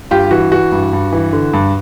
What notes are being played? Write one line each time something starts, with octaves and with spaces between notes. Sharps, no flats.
G2 F4 G4
E3 F#4
E3 F#4
G2
G2
E3
D3
G2